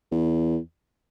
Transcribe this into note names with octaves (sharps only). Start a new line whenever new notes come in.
E2